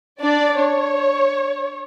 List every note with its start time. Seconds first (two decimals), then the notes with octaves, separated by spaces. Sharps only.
0.20 D4 D5
0.58 C#5